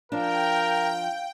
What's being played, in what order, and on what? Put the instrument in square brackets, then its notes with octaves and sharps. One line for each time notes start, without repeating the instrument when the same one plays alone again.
[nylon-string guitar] F3 D4 [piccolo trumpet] A#4 [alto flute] F5 [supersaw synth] G5